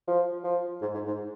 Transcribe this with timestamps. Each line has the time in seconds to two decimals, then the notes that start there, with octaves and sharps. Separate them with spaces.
0.08 F3
0.44 F3
0.82 G#2
0.94 G#2
1.07 G#2